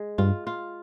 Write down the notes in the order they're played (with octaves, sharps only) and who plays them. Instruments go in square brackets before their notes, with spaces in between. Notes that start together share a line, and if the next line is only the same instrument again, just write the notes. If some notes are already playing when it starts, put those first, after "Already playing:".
Already playing: [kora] G#3
[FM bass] G2 [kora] F4
[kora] F4